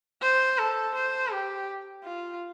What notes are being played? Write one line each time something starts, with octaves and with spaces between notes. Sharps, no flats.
C5
A4
C5
G4
F4